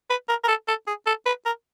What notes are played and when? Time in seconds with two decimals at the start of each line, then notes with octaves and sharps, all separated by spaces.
0.10 B4
0.29 A#4
0.44 A#4
0.48 A4
0.68 A4
0.87 G#4
1.07 A4
1.26 B4
1.46 A#4